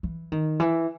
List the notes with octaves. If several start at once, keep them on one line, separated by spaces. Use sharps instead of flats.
E3
D#3
E3